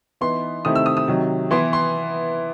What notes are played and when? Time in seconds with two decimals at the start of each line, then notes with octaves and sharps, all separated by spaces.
0.21 E3 B3 D#4 C6
0.65 C3 D#3 A3 C4 E4 D#6
0.75 E6
0.86 D#6
0.97 D#6
1.08 C3 D#3 F#3
1.51 E3 B3 E4 C6
1.73 C6